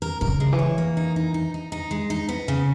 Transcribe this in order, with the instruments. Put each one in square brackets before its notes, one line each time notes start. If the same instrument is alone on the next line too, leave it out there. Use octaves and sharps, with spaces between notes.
[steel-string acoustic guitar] A#4
[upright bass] B2 [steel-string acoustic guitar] A#4
[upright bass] C#3
[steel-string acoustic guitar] G#3
[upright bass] E3
[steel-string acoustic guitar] C#5
A#3
D#4
D#4
D#4
D#4
D#4
G#3
D#4
B3
C#3